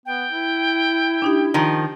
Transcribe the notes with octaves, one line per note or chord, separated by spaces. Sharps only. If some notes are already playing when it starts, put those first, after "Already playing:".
B3 G5
E4
D4 D#4 G4
D#3 F3